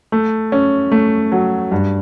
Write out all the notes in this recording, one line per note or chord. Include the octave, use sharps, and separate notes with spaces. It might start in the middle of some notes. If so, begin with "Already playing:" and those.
A3
C#4
A3
F#3
G2